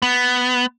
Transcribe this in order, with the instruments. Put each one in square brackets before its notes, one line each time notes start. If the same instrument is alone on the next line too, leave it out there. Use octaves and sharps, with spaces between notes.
[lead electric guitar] B3